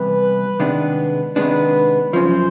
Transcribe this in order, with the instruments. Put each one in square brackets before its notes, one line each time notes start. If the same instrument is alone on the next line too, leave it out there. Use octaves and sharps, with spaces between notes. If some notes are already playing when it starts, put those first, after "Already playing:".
Already playing: [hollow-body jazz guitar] C3 E3 G3 B3 [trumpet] B4
[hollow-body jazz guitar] C3 D#3 G#3 B3 D4
[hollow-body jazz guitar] C3 D#3 G#3 B3 D4 [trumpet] B4
[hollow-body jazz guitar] F#2 C#3 F3 [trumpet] C5